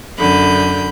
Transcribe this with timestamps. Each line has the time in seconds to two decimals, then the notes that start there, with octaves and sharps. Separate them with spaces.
0.17 F#2 D3 B5 G6